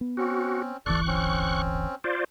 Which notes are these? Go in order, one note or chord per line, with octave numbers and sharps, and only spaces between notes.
B3
C4 C#4 F#4
D1 G1 E3 A4 D5 C#6 F#6
C4 C#4
F4 C5 D5